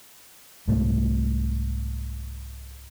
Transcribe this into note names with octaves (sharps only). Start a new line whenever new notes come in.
C2 G#2 A3